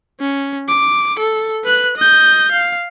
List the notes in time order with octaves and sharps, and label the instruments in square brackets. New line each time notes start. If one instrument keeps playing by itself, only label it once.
[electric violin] C#4
D6
A4
B4 F#6
D#5 G6
F5